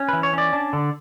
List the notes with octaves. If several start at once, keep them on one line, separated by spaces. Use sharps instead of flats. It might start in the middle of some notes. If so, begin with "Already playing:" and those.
Already playing: C#4
E3 B4
C#5
C#4 D5
D4
D3